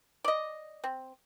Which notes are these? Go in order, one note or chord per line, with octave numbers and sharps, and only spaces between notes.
D5 D#5
C4